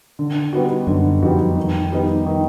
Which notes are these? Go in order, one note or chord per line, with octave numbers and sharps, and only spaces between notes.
D3
G3 B3 D#4 F#4
F#2 D3
F2 G3 B3 D#4 F#4
D#3
G3 B3 D#4
D#3